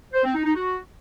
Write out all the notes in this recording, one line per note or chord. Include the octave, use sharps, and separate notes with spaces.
C5
C4
D#4
D#4
F#4